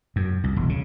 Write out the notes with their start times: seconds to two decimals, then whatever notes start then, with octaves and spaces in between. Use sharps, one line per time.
0.16 F#2
0.44 C2
0.56 E1
0.69 C#3